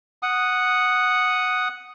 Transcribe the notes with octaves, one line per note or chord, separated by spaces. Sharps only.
F#5 D#6